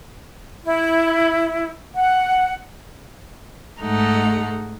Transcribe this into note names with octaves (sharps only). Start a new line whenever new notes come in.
E4
F#5
G#2 G#3 A3 D#4 A4 F#5